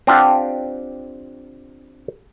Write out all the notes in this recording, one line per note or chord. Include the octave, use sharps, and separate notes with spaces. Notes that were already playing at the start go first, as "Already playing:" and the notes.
C4 D4 F4 G4 F#5